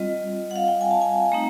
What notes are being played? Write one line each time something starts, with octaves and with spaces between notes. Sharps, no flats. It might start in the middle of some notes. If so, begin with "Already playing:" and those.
Already playing: G3 C4 F4 D#5
F#5
F5
G5
G#5
A5
G#5
A3 C4 D#4 A#5